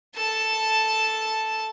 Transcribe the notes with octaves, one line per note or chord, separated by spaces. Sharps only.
A4 A5